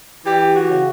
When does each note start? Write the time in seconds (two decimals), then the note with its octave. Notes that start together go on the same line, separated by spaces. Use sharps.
0.25 E3 G4
0.55 F#4
0.69 C#3